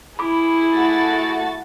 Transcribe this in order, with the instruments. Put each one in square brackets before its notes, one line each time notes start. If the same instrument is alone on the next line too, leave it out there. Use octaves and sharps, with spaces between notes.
[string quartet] E4 G#4 [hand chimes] B5 D6
[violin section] A3 F#4 A6